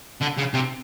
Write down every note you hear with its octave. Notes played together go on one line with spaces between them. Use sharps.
D3
C#3
C3